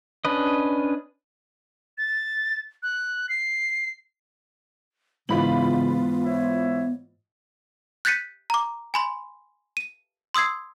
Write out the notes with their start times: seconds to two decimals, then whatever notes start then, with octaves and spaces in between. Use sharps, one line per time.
0.25 C#4 D4 B4 D#5
1.98 A6
2.83 F#6
3.29 C7
5.29 G#2 C#3 E3 B3 F4 B5 F#7
6.24 C5 C#5 E5
8.05 F#6 G6 A6 B6 C#7 D#7
8.50 A#5 D6
8.94 G#5 B5 C6
9.77 D#7
10.34 C6 D#6 E6 G#6 C7